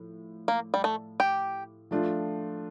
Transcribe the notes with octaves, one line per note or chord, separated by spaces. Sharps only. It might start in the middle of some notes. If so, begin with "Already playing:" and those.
Already playing: A2 F3
A#3
G3
A3
G4
F3 A3 D4 F4